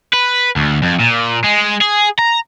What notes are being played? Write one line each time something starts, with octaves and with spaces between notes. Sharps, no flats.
B4
D2
F2
A#2
G#3
G#4
A#5